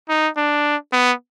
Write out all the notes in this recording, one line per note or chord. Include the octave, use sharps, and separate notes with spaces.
D#4
D4
B3